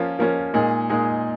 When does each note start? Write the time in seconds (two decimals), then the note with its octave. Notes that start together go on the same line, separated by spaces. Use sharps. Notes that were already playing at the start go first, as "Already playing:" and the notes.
Already playing: F3 A#3 C#4 F4
0.19 F3 A#3 C#4 F4
0.54 A#2 G#3 D#4 G#4
0.90 A#2 G#3 D#4 G#4